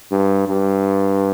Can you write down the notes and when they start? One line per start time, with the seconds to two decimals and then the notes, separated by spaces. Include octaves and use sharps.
0.11 G2
0.47 G2